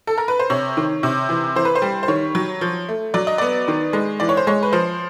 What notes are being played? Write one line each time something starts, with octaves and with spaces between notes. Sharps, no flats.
A4
A#4
B4
C5
C3 C#5
D#3
C3
E3
E3 C5
B4
C5
G3
C5
D#3 C#5
F#3
F3
A3
F#3 D5
D#5
B3 D5
D#3
G#3
E3 D5
C#5
C5
G#3 C#5
B4
F3 C5